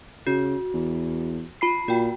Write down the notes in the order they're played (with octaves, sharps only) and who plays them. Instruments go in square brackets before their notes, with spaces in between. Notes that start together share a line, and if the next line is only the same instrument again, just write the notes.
[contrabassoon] C#3 [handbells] F#4
[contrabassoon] E2
[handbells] F4 B5 C7
[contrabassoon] A#2 [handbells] F#4 G5